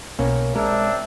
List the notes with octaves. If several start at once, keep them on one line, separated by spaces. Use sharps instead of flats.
B1 B2 A#3 C#4
G#3 C4 D4 A#4 E5